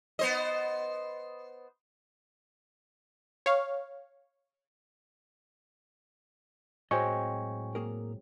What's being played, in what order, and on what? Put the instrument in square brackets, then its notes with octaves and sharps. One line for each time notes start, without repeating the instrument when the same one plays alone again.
[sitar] B3 C5 D#5
[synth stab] C#5 F5
[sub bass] A2 [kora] F#3 G#3 C4 [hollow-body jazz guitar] D#5 [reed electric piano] G5 G#5 C#6
[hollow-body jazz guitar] A#3 G#4 A#4